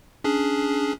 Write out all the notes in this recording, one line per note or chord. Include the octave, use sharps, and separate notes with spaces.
C#4 D4 G#4